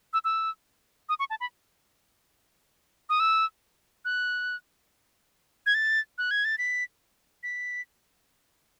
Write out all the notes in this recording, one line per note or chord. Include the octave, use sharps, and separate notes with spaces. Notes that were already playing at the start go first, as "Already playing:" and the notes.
E6
E6
D#6
C#6
A5
B5
D#6
E6
F#6
G#6
A6
F#6
G#6
A6
B6
B6